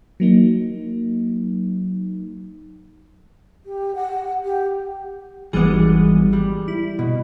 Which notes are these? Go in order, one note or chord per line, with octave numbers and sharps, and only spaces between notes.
F#3 A#3 D#4
G4
F#5
G4
G#1 E3 G3 G#3 B3 G#4
G3
E4
B2